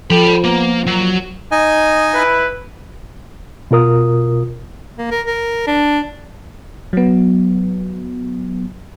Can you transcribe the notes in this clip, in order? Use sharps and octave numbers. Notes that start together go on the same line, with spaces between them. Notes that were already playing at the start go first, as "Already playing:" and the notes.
F3 A4 G5 B5
A#3 B3
A#2 F#3
D#4 D#5 G#5
E4 B4
B2 F4 A#4 D#6
A#3
A#4
A#4
D4
F#3 B3